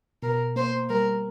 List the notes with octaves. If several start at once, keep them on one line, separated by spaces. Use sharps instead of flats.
B2 A#4
A#3 C5
G3 A#4